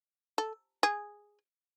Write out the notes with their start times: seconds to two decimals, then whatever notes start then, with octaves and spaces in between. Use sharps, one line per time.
0.38 A4
0.83 G#4